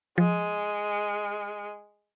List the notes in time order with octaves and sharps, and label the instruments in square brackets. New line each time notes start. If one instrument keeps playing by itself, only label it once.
[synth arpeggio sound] F3 [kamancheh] G#3